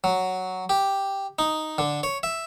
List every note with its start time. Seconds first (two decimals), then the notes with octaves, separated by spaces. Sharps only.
0.04 F#3
0.69 G4
1.39 D#4
1.78 D3
2.03 C#5
2.23 E5